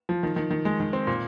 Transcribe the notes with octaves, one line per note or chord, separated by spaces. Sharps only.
F3
D#3
D#3
D#3
G#3
D#3
C4
A#2